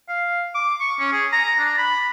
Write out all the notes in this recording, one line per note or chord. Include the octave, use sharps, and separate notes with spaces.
F5
D6
C#6
C#4
G#4
A#5
D4
B5